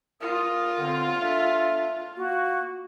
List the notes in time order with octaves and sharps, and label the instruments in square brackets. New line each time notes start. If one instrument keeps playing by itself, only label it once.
[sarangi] F4 [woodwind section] A#4 D#6
[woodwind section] D3 C4
D4 A4 E5
A#3 F#4